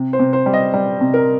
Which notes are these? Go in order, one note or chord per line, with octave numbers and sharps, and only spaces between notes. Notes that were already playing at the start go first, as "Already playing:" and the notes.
Already playing: C3
C5
C3
C5
G3
D#5
G3
C3
A#4